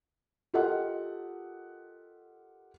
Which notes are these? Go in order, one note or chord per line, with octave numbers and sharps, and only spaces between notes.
F4 G4 A4 A#4 D#5 F#5